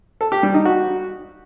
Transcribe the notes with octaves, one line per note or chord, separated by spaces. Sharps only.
A4
G4
G3
D#4
F#4